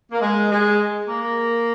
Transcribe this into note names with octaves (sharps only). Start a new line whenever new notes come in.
A#3
G#3
G#3
A#3